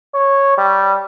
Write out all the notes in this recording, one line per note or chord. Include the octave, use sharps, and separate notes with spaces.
C#5
G3